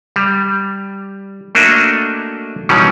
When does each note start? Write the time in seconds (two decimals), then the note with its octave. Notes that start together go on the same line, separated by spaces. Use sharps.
0.16 G3
1.55 A3 A#3 D4 F#4 D#5 E5
2.69 B2 D#3 E3 F#3 G3 C#4